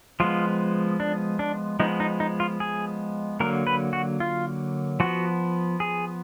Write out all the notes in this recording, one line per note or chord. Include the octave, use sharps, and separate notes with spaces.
F3 G#3 B3 F4
D4
D4
F3 G#3 B3 D#4
D#4
D#4
F4
G#4
D3 F#3 A#3 A#4
B4
F#4
F4
F3 B3 F#4
G#4